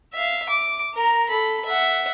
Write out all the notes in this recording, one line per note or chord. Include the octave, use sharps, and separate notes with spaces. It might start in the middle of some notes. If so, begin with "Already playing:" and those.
E5 F5
D6
A#4 A#5
A4 B5
E5 F#5